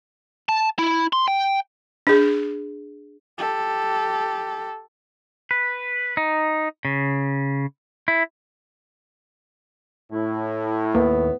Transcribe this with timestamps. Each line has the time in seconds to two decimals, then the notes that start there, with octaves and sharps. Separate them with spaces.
0.49 A5
0.79 E4
1.13 C6
1.28 G5
2.07 D4 G#4
3.38 G4 A4
5.51 B4
6.17 D#4
6.85 C#3
8.08 E4
10.12 A2 E4
10.95 D#2 B3